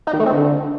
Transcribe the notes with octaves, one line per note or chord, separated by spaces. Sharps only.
D#4
D#3
A3
C4
D3